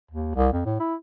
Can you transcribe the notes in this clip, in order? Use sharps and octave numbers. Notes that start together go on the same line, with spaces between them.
D#2
C2
F2
A2
E4